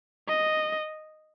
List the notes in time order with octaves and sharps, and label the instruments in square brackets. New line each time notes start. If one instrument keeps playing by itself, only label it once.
[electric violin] D#5